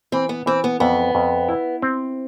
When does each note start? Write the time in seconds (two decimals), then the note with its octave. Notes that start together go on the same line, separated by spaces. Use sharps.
0.12 E3 C4
0.29 B3
0.46 E3 C4
0.64 B3
0.80 F2 B3
1.15 F2
1.49 E4
1.82 C4